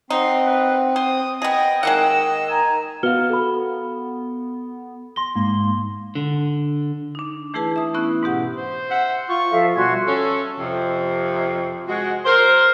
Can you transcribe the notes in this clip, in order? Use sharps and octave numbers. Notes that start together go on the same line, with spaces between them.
C4 D#4 F#5 C6
B4
C5 D#6
B3 G#4 D#5 G5
D#3 G#3 A#3 D#5 F#5 E6
G#5 A#5
B3 F#4 B4 F5 F6 G7
A4 B5
C6 A#6 G7
G#2 A#3
D3
D4 D#4
E3 A3 E4 G#4 B4 A5
E5 D#6
B3 C#4 E4 F#6
G#2 B2 G4 F#5
C5
E5 F#5
F4 C#6
F3 A4 E5 F5
B2 G3 F#4 G#5 C6
C#4 A4
F2 C3
G#3 F#4
A#4 C5